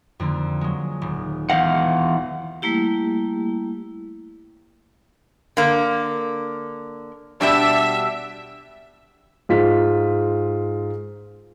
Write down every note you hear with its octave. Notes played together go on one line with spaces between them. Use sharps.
F2 D3 A#3
F#3 G#3
D#1
E2 F5 F#5 G6 A#6
G3 A3 A#3 E4 G4
D3 A#3
B2 G3 D4 E5
G#2 F4 B6